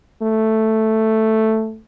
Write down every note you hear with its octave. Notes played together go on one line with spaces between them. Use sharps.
A3